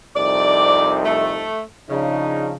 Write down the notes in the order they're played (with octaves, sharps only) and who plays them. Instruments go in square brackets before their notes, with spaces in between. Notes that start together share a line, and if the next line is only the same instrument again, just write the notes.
[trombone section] C2 F2 D#4 [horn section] D5
[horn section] A3
[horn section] C#3 [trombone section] F3 D4 D#4